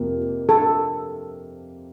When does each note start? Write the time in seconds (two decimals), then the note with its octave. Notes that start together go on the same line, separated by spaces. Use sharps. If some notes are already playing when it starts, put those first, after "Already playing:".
Already playing: F2 C3 F3 A#3
0.49 A4